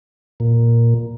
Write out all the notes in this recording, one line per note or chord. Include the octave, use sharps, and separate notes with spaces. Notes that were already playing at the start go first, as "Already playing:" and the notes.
A#2